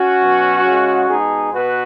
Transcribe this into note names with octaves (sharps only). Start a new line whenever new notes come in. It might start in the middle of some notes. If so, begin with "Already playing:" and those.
Already playing: C#4 F#4
B2 F#3
C#3 G#3
B2 G#3 D#4 G#4
B2 F#4 B4